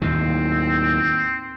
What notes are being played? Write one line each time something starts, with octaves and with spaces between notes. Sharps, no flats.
D#2 A2 D#3 C4